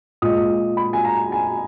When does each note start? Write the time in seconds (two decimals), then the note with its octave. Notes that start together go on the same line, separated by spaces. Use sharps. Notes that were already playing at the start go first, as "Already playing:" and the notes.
0.22 A#2 G#3 D#6
0.77 B5
0.93 G#5
1.04 A#5
1.32 G#5